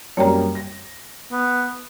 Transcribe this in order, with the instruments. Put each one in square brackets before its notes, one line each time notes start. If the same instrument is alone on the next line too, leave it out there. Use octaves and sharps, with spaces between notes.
[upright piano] F#2 G3 A#3 [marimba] C#5 G5 A#5
[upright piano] A#6
[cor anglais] B3